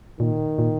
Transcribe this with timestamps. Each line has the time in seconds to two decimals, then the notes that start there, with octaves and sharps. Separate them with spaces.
0.20 A#2 D#3
0.58 A#2